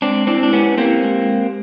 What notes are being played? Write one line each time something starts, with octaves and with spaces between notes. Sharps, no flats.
G#3 C4 D4
C4 D4 E4
D4
B3 C#4 G4
A#3 C4 G4
G#3
G4